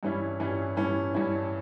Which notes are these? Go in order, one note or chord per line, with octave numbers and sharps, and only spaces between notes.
G2 E3 G3 C#4 E4
G2 E3 G3 C#4 E4
G2 E3 G3 C#4 E4
G2 E3 G3 C#4 E4